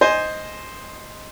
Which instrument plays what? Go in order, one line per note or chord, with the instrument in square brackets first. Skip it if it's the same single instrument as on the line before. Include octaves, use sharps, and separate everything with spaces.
[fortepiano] C5 D#5 G#5